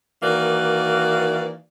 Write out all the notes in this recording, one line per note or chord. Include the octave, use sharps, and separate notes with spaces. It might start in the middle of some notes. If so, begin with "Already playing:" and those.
D#3 E3 A#3 F#4 D5